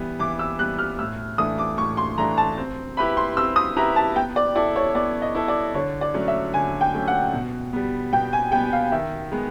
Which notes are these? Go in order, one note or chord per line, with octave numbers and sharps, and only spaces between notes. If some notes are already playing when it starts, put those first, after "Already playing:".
Already playing: E3 G3 B3
E3 D6
E6
G3 B3 F#6
F6
A2 E6
E3 A3 D4 D#6
D6
A2 C#6
C6
E3 A3 D4 A#5
A5
C4
E4 G4 B4 E5 B5
C6
C4 E6
D#6
E4 G4 B4 E5 A#5
A5
B3 G5
D5
E4 A4 D5
C#5
B3 D5
D#5
E4 A4
D5
D3 C#5
D5
F#3 A3 C#4
E5
D3 G#5
G5
F#3 A3 C#4
F#5
B2
G3 B3
B2 G5
G#5
G3 B3 G5
F5
D#3 E5
G#3 B3